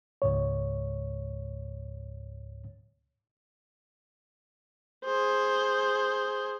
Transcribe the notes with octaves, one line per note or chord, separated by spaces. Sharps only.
C#2 G#2 C#5
G#4 C5